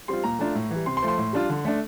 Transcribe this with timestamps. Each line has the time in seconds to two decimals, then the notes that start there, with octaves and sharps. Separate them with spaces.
0.08 G3 C4 F4 C6
0.24 A#2 A#5
0.39 A3 D4 F4
0.55 A2
0.70 E3
0.76 G3
0.86 C3 C6
0.97 C6
1.02 F3 A3
1.08 C6
1.18 A2
1.33 G3 D4 F4
1.50 D3
1.65 A3 D4